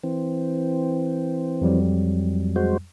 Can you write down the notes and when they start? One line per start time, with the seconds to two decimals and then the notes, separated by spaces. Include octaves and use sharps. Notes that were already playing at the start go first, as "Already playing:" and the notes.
0.03 E3 C4
1.61 F2 F#3 G3
2.56 G#3 F#4 C5